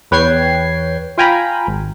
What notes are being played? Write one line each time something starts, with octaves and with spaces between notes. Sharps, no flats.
E2 B4 C#5 G5 G#6 C7
F4 F5 G5 G#5 A#5 B5
G#1